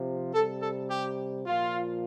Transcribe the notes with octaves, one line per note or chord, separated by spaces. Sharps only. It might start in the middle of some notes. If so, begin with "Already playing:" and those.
Already playing: C3 F3
C3 G3 A4
A4
G4
A#2 F3 F4